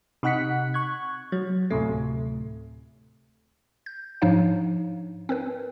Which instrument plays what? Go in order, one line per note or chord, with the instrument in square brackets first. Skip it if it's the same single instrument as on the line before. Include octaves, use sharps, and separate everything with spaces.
[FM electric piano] C3 D#4 F#5 F#6 B6 C#7
C#6 F#6 G#6
F#3
D2 A2 C3 A3
[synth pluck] G6
G#2 F3 D4 D#4 C#5 F5
C4 A#4 B4